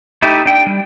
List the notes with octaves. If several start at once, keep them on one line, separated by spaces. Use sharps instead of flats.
A3 D#4 E4 G4
D4 G5
G3